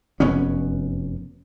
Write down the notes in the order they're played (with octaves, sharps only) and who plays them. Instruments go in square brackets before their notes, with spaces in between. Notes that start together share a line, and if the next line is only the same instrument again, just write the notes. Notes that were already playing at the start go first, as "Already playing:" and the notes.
[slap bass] F1 F#2 B3 C#4